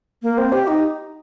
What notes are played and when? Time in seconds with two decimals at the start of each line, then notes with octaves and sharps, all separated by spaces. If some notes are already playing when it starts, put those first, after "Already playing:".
0.23 A#3
0.38 C4
0.52 G4
0.68 D#4